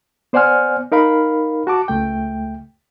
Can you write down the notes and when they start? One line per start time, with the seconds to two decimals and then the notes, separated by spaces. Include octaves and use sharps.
0.33 B3 C5 D5 F#5 G#5 F6
0.92 D#4 A#4 F5 B5
1.67 F#4 A5 D6
1.88 C#2 A3 G5